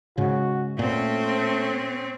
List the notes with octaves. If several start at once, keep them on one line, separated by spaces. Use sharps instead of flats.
G#2 C#3 F#4
A#2 A3 C4 C#4